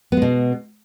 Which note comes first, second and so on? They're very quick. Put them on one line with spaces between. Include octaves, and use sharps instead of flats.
B3 G#3 B2